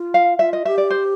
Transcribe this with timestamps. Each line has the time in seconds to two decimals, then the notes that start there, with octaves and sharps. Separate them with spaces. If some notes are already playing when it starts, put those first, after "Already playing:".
Already playing: F4
0.14 F5
0.39 F4 E5
0.53 D#5
0.65 G4 E5
0.78 D5
0.90 C5